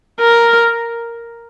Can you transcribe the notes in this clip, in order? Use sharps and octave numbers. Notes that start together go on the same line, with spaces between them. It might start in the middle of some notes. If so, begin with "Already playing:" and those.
A#4